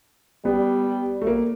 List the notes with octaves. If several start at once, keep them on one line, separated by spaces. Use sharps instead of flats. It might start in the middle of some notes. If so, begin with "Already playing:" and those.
G3 B3
A3
A#3